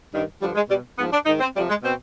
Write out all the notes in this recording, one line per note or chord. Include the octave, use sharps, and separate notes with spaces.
G2 D#3
G2 D3 F3 G3
G#3
B2 G3
G#2 F3 B3
D4
G#2 D#3 D#4
C4
F2 C3 F3 G3
G#3
B2 C4